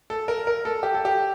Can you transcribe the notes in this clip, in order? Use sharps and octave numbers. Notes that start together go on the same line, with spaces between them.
A4
A#4
A#4
A4
G4
A4
G4